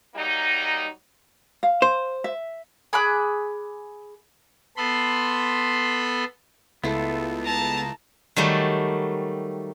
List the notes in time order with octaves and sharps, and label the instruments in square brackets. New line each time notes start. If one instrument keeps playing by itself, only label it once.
[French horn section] F#3 G3 A#3 D#4
[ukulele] F5
[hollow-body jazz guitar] C5
[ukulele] E5
[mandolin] G#4 B5 D6 F#6
[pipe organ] B3 A4 B5 C6
[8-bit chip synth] C#2 [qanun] A3 E4 [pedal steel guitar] B3 F4 A4
[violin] A5 A#5
[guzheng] D#3 F#3 G3 A3